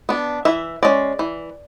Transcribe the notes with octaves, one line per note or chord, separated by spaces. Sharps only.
B3 D4
E3 E5
G#3 C#4 D5
E3